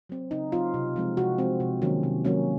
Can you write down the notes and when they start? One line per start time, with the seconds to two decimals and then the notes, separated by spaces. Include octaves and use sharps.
0.09 F#3 C4
0.31 C#3 D#4
0.52 F#3 C4 F4
0.74 C3
0.96 F3 G#3 C4
1.17 C3 F#4
1.38 F3 G#3 C4
1.60 C3
1.82 D#3 F#3 A#3 C#4
2.03 C3
2.25 D#3 F#3 A#3 C#4